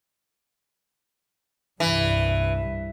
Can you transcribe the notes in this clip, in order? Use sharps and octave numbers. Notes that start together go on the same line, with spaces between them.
C2 G2 E3